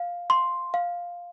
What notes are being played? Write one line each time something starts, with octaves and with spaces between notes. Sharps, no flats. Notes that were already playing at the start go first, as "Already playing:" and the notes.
Already playing: F5
C6
F5